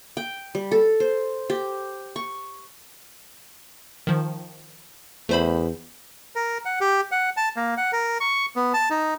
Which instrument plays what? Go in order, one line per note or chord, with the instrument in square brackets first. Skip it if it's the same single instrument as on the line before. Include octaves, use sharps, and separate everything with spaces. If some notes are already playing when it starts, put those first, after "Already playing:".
[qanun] G5
G3
A4
C5
G4
C#6
[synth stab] D#3 F3
[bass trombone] E2 [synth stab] A3 C5 B5
[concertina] A#4
F#5
G4
F#5
A5
A#3
F#5
A#4
C#6
B3
A5
D#4